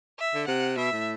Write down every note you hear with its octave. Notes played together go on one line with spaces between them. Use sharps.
E5
D3
C3 F#5
B2 E5
A2